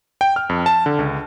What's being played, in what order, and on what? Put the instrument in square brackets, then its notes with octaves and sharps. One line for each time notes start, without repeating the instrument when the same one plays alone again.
[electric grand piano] G5
F6
F2
A5
D3
C#2